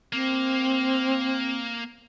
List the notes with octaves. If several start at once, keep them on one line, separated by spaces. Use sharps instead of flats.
A#3 C4